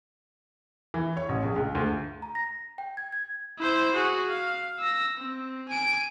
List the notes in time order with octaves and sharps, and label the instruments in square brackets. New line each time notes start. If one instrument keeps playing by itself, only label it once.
[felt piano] E3
C#5
A1
A#1
C#2
D2
[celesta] A#5
A#6
G5
G#6
G#6
[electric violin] E4 C5
F#4 G#4
F5
E6 A#6
C4
G#5 D7